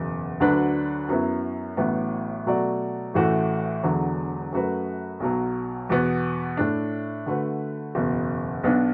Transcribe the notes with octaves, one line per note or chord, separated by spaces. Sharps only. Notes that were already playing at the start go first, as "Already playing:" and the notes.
Already playing: F#1 E2 B2
D2 D3 F#3 D4 B4
F#2 F#3 B3 E4
A1 A2 F#3 B3
B2 F#3 A3 F#4 D5
A1 A2 E3 A3 F#4
E1 E2 D3 F#3
F#2 F#3 A3 F#4 B4
B1 B2 F#3
E2 B2 B3
A2 A3 D4
D3 A3 F#4 B4
F#1 E2 B2
B1 B2 B3 D4